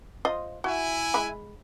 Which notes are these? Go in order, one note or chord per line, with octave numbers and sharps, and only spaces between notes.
F4 C5 D#5
E4 F#4 E5 G#5
G#3 B5